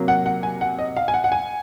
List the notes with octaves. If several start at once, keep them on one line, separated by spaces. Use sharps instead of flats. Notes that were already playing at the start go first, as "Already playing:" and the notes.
Already playing: C3 F#3 A#3
F#5
F#5
G#5
F#5
D#5
F5
G#5
F#5
F#5
G#5